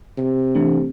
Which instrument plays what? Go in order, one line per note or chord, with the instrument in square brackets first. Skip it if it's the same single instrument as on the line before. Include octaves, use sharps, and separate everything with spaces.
[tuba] C3
[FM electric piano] E3 A3 D4